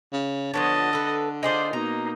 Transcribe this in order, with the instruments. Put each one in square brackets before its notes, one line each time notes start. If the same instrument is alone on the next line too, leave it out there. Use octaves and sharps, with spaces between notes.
[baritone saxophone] C#3
[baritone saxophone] D3 [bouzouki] F3 B3 C#5 [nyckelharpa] D#5 A5
[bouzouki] A4 B4
[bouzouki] D#4 G#4 D5 [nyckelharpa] F4 C5
[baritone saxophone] B2 [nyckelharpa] A#3 D#4 [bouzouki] A#5